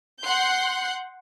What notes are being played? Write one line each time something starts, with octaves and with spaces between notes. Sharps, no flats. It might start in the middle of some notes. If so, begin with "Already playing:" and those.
F#5 C6 F#6 G6